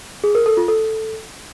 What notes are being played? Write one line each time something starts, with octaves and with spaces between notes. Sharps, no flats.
G#4
A#4
A4
F4
A4